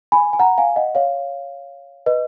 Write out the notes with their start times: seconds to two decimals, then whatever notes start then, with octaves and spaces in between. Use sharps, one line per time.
0.12 G#5 B5
0.33 G#5
0.39 F#5 A#5
0.58 F5 G#5
0.76 D#5 F#5
0.95 C#5 F5
2.06 B4 D#5